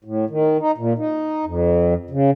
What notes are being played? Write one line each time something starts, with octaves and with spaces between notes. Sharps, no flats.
A2
D#3
D#4
A#2
D#4
F2
C#3